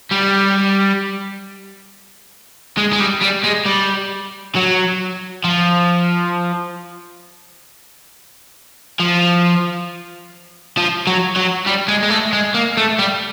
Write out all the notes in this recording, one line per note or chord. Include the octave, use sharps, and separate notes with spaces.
G3
G#3
G#3
G3
G3
G#3
G3
F#3
F3
F3
F3
F#3
F#3
G3
G#3
G#3
A3
G#3
A#3
A3
G3